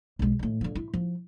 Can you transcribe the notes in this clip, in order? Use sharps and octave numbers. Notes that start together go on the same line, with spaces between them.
B1 G#3
A2 D#3
D3 F3
E4
F3